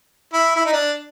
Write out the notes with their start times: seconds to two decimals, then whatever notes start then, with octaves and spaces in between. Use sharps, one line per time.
0.33 E4
0.56 E4
0.66 D#4
0.73 D4